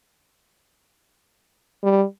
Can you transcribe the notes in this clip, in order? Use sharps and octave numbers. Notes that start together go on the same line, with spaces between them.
G3